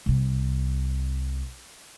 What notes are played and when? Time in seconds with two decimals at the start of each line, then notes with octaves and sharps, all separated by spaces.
0.06 C2 C3